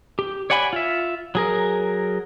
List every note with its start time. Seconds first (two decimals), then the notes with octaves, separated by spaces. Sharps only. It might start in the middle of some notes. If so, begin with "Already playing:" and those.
0.19 G4
0.50 C#5 D5 F#5 G#5 B5
0.73 F4 E5
1.35 F#3 G#4 A#4